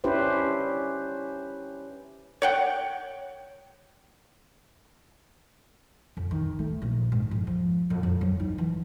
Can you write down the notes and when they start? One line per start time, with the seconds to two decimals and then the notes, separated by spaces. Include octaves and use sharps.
0.04 C#4 D4 E4 G4 B4 C5
2.42 C#5 F#5 G5
6.17 F2
6.31 D#3
6.59 A3
6.82 A#1
7.12 G#2
7.31 F2
7.47 F3
7.90 F2
8.03 F2
8.21 F#3
8.40 D#4
8.58 E3